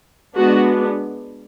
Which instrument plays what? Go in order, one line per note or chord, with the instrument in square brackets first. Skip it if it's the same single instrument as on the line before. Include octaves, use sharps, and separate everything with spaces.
[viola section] G#3 B3 D4 F#4